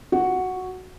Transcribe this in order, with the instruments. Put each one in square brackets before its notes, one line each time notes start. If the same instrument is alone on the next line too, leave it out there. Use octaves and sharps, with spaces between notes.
[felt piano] F#4